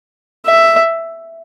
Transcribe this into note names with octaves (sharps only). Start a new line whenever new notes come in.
E5